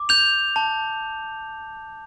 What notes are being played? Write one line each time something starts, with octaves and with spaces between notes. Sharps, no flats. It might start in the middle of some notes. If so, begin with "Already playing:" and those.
Already playing: D6
G6 F7
A5